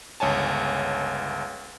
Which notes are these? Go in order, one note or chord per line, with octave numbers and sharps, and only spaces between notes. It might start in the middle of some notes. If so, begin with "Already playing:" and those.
G1 C#2 C#5 G#5 A5